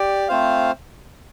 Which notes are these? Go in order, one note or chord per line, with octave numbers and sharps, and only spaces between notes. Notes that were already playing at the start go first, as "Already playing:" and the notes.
Already playing: G4 D5
A3 C4 F4 C5 F5